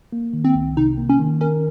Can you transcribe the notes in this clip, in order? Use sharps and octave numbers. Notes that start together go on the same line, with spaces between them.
A#3
D#3
C4
C2
C3 D#4
A#3
C#4
D#3
C#4 A#4